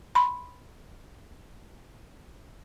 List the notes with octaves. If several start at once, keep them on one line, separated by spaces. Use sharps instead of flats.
B5 C6